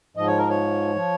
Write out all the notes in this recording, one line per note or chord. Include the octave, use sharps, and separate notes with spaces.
G#2 F3 D#5
C#5
A#4
C#5
F3